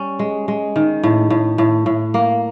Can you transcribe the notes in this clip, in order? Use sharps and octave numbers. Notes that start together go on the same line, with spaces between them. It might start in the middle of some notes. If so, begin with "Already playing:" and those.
Already playing: G3 C#4
G#3
G#3
D#3
A2
A2
A2
A2
A#3